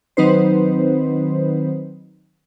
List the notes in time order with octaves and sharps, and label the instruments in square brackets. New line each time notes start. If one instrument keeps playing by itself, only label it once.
[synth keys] D#3 F#3 C4 D#4 B4 C5